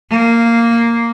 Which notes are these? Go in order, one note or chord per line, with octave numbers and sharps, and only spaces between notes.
A#3